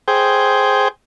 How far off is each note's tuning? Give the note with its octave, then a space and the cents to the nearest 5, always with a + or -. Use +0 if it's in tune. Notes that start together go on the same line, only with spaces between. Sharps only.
G#4 +5 C5 +0 G5 +0